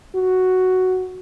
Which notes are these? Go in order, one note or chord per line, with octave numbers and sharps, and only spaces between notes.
F#4